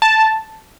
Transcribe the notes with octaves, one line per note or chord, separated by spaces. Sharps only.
A5